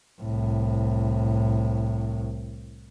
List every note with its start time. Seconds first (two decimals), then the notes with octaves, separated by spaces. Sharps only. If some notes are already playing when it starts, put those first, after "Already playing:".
0.21 C2 A2